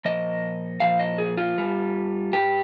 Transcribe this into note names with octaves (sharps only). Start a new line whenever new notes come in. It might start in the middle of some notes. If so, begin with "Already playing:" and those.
A#2 F3 D#5
A#2 F3 F5
D#5
G#4
F4
G2 G3
G2 G3 G4